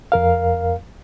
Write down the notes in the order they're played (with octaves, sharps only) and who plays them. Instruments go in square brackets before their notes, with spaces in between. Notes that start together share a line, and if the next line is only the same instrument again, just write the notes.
[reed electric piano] F2 A#4 F5